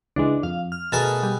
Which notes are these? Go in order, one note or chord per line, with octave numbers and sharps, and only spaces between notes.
C#2 E3 G#3 D4
F2 F5
F6
B2 A3 G#4 A#4 A5
G3